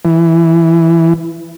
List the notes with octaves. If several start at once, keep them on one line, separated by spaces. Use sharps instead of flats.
E3